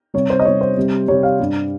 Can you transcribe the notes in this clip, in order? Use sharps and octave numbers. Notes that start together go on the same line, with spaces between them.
C3 G3 C#5
C5
D#5
C3 G3 C#5
C5
C3 G3
C3 G3 C#5
F5
G2 G3